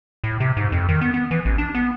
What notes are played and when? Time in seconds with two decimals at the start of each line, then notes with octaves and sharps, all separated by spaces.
0.24 A2
0.40 C3
0.57 G#2
0.72 F2
0.89 D#3
1.01 B3
1.14 B3
1.31 E3
1.45 A1
1.58 D4
1.75 B3